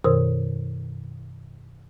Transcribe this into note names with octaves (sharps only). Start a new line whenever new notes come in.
F#2 B2 D#3 A#4 C5 D#6